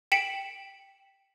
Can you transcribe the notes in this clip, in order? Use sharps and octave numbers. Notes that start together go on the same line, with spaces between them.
G5 B6 C#7 E7 F#7